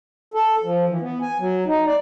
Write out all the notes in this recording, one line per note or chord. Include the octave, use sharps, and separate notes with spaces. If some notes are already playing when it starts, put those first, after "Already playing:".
A4
F3
E3
B3
G#5
F#3
D#4
D5